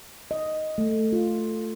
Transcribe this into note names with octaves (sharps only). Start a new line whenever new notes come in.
D#5
A3
F4